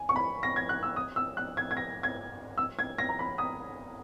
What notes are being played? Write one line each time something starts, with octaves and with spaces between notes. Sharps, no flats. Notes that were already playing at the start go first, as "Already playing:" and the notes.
Already playing: G#5
C#6
B5
A#6
G#6
F#6
E6
D#6
E6
F#6
G#6
G#6
A#6
G#6
E6
G#6
A#6
A#5
B5
D#6